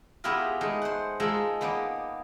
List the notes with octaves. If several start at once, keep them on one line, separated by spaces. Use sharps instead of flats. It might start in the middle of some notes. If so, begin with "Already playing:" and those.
B3 E4 F4 G4 G#4 A#4
G#3 A3 D#4 D#5
C5 F#5
G#3 D#4 F4 A4 A#4
A#3 B3 D#4 D5